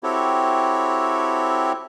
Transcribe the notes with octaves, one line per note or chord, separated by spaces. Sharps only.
C4 E4 F#4 G4 A4 C#5